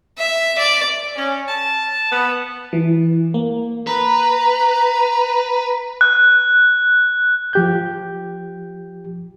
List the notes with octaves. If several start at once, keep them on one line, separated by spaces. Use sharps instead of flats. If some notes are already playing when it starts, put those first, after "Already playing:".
E5
D5
C#4
A5
B3
E3
A#3
B4 A#5
F#6
F3 G4 G6